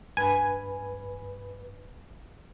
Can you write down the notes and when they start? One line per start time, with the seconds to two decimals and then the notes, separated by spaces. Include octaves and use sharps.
0.17 G2 B4 G#5